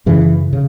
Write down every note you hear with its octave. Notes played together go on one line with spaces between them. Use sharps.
F#2 C#3 E3
C#3